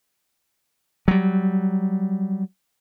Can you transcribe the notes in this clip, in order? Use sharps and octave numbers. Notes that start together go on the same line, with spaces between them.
F#3 G3